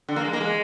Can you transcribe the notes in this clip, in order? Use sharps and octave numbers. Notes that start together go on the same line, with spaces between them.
D3
A#3
G#3
A#3
G#3